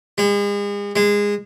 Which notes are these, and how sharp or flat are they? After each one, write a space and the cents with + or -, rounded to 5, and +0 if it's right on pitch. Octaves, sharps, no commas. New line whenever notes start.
G#3 -40
G#3 -20